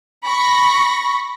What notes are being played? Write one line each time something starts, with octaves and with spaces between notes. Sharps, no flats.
B5 C#6 A#6